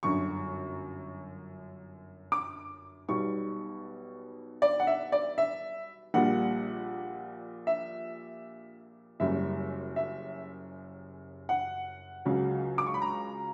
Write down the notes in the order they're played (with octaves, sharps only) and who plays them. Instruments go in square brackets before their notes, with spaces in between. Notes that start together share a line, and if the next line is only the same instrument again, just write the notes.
[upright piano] G1 F#2 D3 C#6
D6
B1 B2 G3 C#6
D5
F#5
E5
D5
E5
A#1 A#2 G3 F#5
E5
F#1 F#2 C#3 G3 E5
E5
F#5
C#2 C#3 F#3
D6
C#6
B5
A#5